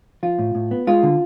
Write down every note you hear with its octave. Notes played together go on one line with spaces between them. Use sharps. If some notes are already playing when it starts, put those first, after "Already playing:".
F3 F4
A2
A2
B3
G#3 F4
D3